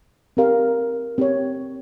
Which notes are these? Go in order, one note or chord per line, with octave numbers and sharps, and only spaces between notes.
C4 G4 A#4 F5
C4 G4 C#5